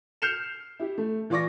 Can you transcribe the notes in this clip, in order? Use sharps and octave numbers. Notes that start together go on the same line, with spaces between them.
F6 G6 C7 C#7 E7 F7
E4 G4
A3
E3 F4 D5 C#6 D6 A#6